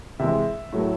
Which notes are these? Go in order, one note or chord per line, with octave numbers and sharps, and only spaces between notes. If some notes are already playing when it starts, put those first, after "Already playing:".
C3 E3 G#3 E5
A2 F#3 A3